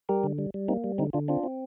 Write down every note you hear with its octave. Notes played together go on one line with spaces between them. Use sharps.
G3 G4 A#4
D3
G3
G3
A#3 C4 D#4
G3
D3 C4 D#4
D3 D4 F4
C4 D4 F4
C4